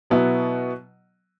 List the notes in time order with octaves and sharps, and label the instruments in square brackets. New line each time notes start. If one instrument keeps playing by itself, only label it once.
[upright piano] B2 F#3 B3 E4